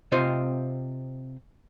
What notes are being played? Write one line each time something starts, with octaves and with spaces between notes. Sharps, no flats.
C3 C4 F4 C5 D#5